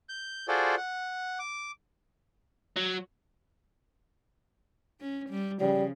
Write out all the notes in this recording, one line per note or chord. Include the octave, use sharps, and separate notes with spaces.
G6
F4 F#4 G#4 A4 C5 D5
F#5
D6
F#3
C#4
G3
C#3 F3 G3